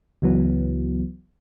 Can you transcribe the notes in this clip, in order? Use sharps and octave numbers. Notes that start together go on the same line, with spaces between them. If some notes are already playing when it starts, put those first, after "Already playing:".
C#2 E3 F#3 B3